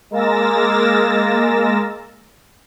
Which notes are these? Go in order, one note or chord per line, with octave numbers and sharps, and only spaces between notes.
G#3 A#3 A#4 E6 A6 A#6